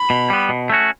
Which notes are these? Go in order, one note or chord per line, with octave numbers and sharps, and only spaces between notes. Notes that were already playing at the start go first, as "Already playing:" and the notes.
Already playing: B5
B2
G3 B3
B2
A3 C#4 F#4